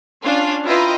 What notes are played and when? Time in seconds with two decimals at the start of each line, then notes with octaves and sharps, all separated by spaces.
0.23 C#4 D4 F4 F5
0.65 E4 F4 B4 D#5 G5 A#5